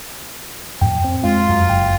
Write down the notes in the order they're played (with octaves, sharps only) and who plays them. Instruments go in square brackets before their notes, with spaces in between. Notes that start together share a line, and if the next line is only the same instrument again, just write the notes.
[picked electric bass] F2 A2 [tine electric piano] G5
[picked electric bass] C4
[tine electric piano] F2 G#3 F5 [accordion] F4
[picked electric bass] F#2
[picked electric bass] F#1 [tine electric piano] G5